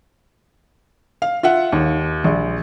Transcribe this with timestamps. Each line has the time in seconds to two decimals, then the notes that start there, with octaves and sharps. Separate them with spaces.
1.22 F5
1.43 F4 E5 F#5
1.72 D#2
2.24 A#1